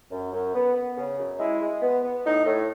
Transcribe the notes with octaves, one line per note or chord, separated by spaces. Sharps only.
F#2
F#2
B3
B3
C#3
F#2
G#3 E4
G#3
B3
B3
A2 D#4
A2